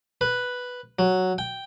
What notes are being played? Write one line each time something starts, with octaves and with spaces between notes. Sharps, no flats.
B4
F#3
G5